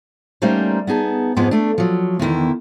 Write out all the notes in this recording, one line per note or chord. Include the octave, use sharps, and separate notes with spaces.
G3 A3 A#3 C#4 D#4 C5
B3 D#4 G#4 A5
F2 G#2 F3 G#3 B3
A3 D4
F3 F#3
E2 D3 D#3 E4